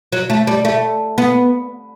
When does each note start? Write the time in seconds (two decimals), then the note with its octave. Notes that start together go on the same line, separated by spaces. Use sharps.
0.12 F#3
0.30 A3
0.47 G3
0.65 A3
1.18 B3